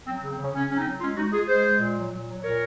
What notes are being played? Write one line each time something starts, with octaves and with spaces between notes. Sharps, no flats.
F#3 C4
C#3
C4
C#3 C#4
C#3 C#4
F#3 C#4
C4 D#4
F#3
G#3 C#4 F4
G#3 D#4 F#4
G#3 F4 G#4
G#3 G#4 C5
G#3
A#2
F#3
A#2
F#3
A#2 A#4 C#5